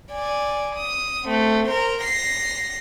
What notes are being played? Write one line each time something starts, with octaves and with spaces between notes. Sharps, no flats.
D5 G#5
D#6
A3 C4
A#4 C5
A#6 C7